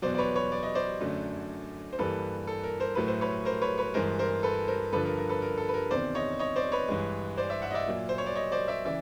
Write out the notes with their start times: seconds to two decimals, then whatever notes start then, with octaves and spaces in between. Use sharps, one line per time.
0.02 E2 B2 F#3 C5 D5
0.14 D5
0.18 B4 C#5
0.35 B4 C#5
0.52 D5
0.63 D#5
0.75 C5 D5
1.00 F#2 D3 F#3 A3
1.93 C5
1.99 G2 E3 G3 A#3 A4 B4
2.47 A4
2.63 A#4
2.80 A#4 C5
2.95 A2 F#3 A3 B4
3.08 C5
3.21 B4 C#5
3.45 A#4 C5
3.61 B4 C#5
3.78 B4 C#5
3.94 G2 E3 G#3 A#4 C5
4.19 A#4 C5
4.43 A4 B4
4.68 A#4 C5
4.92 G2 D3 F3 A4 B4
5.05 A#4
5.17 A#4
5.29 A4 B4
5.42 A#4
5.57 A4
5.69 B4
5.74 A#4
5.91 E2 C3 D#3 C5 D5
6.15 C#5 D#5
6.40 C#5 D#5
6.56 C5 D5
6.72 B4 C#5
6.88 G2 E3 G#3
7.37 C5 D5
7.50 D5 E5
7.62 E5 F#5
7.71 D#5
7.74 D5 E5
7.87 A#2 F#3 A#3
8.09 C5
8.18 C#5
8.26 D5
8.35 C#5 D#5
8.52 C5 D5
8.68 D5 E5
8.85 C#3 E3 D5 E5